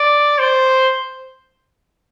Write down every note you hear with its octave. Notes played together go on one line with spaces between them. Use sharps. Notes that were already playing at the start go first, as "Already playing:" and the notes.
Already playing: D5
C5